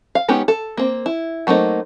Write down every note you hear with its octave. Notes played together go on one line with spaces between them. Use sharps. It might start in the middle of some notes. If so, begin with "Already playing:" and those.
F5
G#3 B3 C#4 D#4 G4
A4
A#3 C4
E4
F#3 A3 A#3 C4 D#4